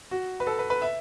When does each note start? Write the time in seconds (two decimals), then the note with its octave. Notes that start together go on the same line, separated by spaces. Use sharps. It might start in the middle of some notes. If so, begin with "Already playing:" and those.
0.11 F#4
0.40 B4
0.47 A4
0.59 B4
0.70 B4
0.82 E5